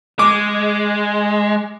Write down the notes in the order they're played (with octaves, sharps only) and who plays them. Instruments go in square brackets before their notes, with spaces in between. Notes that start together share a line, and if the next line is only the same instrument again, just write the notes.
[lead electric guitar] G#3 [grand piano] D6